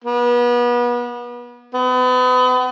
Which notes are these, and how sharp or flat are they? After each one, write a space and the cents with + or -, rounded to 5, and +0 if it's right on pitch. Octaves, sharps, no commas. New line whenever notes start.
B3 -30
B3 +35